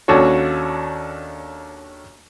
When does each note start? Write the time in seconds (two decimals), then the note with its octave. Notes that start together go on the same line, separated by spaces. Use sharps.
0.08 D#2 C#4 D4 F#4 A4 C#5